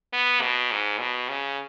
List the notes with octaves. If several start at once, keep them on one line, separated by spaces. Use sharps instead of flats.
B3
B2
G#2
B2
C#3